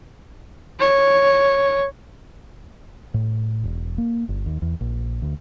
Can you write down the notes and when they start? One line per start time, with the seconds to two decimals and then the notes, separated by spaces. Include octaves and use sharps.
0.80 C#5
3.14 A2
3.64 E1
3.98 A#3
4.29 G1
4.46 D#2
4.62 E2
4.81 A#1
5.22 D2